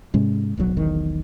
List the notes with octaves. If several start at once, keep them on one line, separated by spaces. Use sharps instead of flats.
G#2 C3 G#3 C#4
D1 B1 B2 F#3
E1 B1 E2 D#3